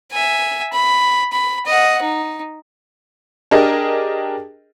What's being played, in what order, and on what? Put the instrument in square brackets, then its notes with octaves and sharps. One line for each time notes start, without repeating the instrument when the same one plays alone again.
[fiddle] E5 G#5
B5
B5
D#5 F#5
D#4
[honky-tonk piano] D4 G4 G#4 A#4 D#5